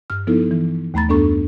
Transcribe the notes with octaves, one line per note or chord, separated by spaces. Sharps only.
G2 F6
F3 B3 D#4 E4 A4
E3
D#2 A3 A#5 B5 A6
F#2 B3 D4 A4 C#6